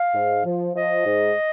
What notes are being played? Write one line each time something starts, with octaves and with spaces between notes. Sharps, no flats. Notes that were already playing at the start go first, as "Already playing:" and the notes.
Already playing: F5
G#2
F3
F3 D#5
G#2